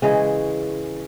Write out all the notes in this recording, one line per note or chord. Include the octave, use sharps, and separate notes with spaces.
C#3 E3 G#3 C#4